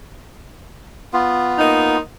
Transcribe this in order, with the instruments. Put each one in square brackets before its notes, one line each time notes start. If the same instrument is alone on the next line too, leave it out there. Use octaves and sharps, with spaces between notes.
[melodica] B3 F4
[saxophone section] A#3 D#4